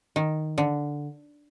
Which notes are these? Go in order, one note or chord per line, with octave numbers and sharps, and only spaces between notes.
D#3
D3